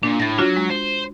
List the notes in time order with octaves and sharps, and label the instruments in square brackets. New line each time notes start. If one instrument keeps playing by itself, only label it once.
[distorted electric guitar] A#2 [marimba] D4
[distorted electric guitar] A2 [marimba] A6 A#6
[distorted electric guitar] F#3 [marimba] D4 F4 F#4
[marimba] G#3
[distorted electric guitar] C5